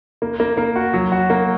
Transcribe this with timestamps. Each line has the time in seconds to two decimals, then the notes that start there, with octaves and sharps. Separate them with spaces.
0.22 A#3
0.40 A#3
0.57 A#3
0.76 F#4
0.94 F#3
1.12 F#4
1.30 A#3